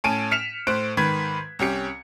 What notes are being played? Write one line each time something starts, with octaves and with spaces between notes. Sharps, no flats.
A2 C#4 G#5 A5 D7 D#7
F6 B6 C#7 E7 F7
A2 C5 F#6 D7
G#2 D#3 B4 G#6 B6
C2 C#4 G4 C#7